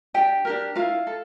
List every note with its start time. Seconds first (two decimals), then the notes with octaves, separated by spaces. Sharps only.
0.14 D4 G4 A4 G5
0.45 D4 G4 A#4
0.75 E4 F4 A#4 F5
1.07 A4